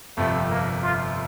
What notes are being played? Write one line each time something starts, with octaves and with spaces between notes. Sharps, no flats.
G1 F2 C3 F3 A3 C4
A#3
F4